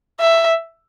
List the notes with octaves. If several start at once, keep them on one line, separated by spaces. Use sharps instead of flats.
E5